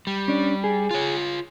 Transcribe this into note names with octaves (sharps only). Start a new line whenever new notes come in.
G3
C#4 D4
G#4
F4 C#5